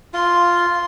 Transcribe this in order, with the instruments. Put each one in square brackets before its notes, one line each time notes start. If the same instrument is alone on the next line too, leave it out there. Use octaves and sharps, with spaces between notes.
[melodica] F4 [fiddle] C6